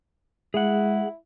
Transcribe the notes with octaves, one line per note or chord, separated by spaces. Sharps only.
G#3 E4 G#4 F#5